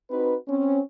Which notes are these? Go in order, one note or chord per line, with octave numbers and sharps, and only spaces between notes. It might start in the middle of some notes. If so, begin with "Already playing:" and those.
C4 D#4 F#4 B4
C4 C#4